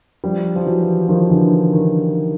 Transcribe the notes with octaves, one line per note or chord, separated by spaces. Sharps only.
F3 G3
F3
E3 F#3
D#3 F3
D3 E3
D#3